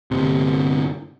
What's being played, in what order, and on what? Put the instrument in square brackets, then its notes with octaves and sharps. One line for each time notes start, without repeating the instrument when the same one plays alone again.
[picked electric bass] G1 C3